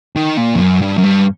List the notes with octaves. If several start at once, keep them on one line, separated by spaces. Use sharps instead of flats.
D#3
A#2
F2
F#2
G2
F#2
G2